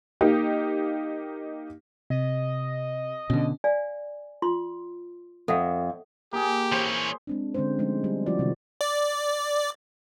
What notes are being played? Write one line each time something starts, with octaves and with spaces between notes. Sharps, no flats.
A#3 D#4 G4
C3 D#5
B2 D3 C#4
D5 F5 G#5
F4 C6
F2 A4 E5 F#5
A#3 G4 G#4
E3 C5 C#5
G#3 C4 D4
D3 G#3 C4 C#4 C5
F3 G#3 A3 C#4 D#4
G3
F3 E4 F#4 D5
C3 D#3
D5